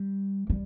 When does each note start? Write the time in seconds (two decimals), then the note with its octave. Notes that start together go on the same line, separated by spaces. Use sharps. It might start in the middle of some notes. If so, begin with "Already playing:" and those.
Already playing: G3
0.50 G3